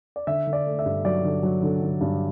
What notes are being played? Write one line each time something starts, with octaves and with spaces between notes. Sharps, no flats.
D5
D3 E5
D3
D5
A3
E5
G2
F#3 D5
D3
F#3
D3
D3
G2